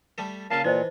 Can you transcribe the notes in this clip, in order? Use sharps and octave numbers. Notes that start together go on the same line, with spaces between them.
G3 A3 A4
A#2 C#3 C#4 F5 A5
A#2 E3 D#4 C5 D#5